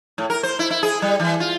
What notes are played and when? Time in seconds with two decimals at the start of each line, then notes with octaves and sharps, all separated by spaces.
0.18 A2
0.30 A#4
0.43 C5
0.59 E4
0.70 E4
0.83 G#4
1.02 G3
1.20 E3
1.40 F4